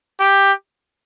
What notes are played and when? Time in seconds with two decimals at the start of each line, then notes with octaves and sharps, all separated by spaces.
0.20 G4